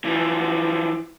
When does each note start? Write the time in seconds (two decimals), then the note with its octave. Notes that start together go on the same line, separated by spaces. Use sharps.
0.05 E3 F3